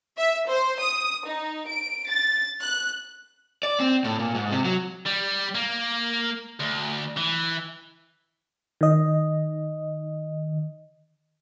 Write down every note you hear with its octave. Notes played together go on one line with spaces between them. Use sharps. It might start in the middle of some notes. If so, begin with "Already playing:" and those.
E5
C5
D#6
D#4
D7
A6
F#6
D5
C4
A2
A#2
G#2
C3
F#3
G3
A#3
D2
E3
D#3 D#5